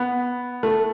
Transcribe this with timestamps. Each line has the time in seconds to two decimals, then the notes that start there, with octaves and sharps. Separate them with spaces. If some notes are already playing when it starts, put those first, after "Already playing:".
Already playing: B3
0.63 A3